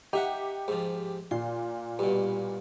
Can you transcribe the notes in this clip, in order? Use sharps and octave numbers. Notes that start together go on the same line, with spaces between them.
D#4 G4 E5 F#5
G#2 F3
A#2 C6
G2 B2